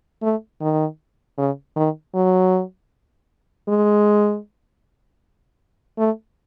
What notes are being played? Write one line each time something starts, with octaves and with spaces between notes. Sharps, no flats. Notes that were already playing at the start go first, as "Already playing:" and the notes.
A3
D#3
C#3
D#3
F#3
G#3
A3